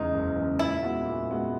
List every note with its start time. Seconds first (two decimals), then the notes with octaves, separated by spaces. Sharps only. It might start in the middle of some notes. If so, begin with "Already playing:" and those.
Already playing: E2 C#3 G#3 D#4
0.14 F#1
0.37 E2 C#3 G#3
0.59 A#2 E4
0.83 G#3 B3 F#4
1.06 A#2
1.30 G#3 B3 F#4